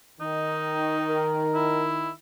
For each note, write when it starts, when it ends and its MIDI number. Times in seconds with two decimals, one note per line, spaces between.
0.21 2.12 51
0.21 1.31 63
1.09 1.88 70
1.55 2.10 64